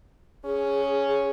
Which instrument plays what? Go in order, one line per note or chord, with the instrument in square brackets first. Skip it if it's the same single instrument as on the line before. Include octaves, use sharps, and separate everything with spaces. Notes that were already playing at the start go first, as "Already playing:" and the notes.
[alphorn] C#4 [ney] G#4
[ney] G#4